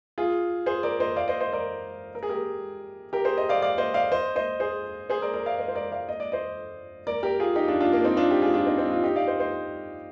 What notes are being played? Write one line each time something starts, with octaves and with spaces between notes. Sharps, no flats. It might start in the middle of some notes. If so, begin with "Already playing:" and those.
F4 G#4
G#4 C5
A#4 D5
C5 D#5
D5 F5
C5 D#5
C5 D#5
A#4 D5
A#4
G#4
G4 A#4
G4 A#4
G#4 C5
C5 D#5
D5 F5
D5 F5
C5 D#5
D5 F5
C5 D#5
C5 D#5
G#4 C5
G#4 C5
A#4 D5
A#4 D5
D5 F5
C5 D#5
C5
A#4 D5
D5 F5
D#5
D5
C5 D#5
A#4 D5
G4 A#4
F4 G#4
D#4 G4
D4 F4
D4 F4
A#3 D4
C4 D#4
D4 F4
G4
F4 G#4
D4 F4
C4 D#4
C4 D#4
D4 F4
D#4 G4
D5 F5
C5 D#5
C5 D#5